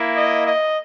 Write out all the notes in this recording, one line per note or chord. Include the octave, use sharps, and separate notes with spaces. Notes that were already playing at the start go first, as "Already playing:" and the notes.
Already playing: A#3 E4
D#5
D#5